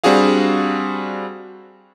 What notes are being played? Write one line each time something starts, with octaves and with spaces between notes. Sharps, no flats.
G3 C4 D4 F#4 G#4 F5